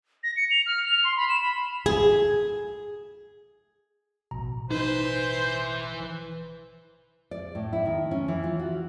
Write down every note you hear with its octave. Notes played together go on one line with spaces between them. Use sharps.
A#6
C#7
F7
F6
F7
C6
B5
E7
B5
G#4
A1 B2 A#5
E3 D#4 B4 C5
D5
A2
E4
D#3
C#4
E3
F4
F#4